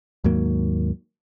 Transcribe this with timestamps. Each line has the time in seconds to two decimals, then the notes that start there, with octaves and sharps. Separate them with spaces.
0.24 D#2 G#2 F#3 A#3